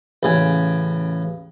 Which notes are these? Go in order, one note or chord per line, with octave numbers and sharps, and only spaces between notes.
A1 C#3 G#5